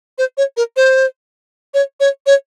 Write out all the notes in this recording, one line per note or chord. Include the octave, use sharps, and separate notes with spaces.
C5
C#5
A#4
C5
C#5
C#5
C#5